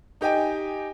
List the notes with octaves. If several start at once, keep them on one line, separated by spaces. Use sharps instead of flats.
D#4 G4 D#5 G5 G#5